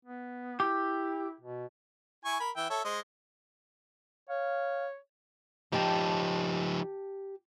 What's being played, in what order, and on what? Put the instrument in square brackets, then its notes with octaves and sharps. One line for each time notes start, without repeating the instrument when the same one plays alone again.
[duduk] B3
[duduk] E4 [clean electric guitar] G4
[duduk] B2
[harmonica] E4 G#5 C#6
A#4 B5
E3 E5 G5
A4 C#5 E5
G#3 C5 D#5
[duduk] C#5 [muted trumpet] F5
[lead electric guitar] F3 D#4 [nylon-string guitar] G4 G5 A5